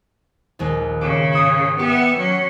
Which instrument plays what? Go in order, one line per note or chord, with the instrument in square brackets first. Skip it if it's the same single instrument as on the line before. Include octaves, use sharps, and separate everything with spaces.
[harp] A#1 D#2 G#3
[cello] C#3 [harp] D6
[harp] G#2 D#6 G#6
[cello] B3 E5 [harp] G4
[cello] F#3 C#4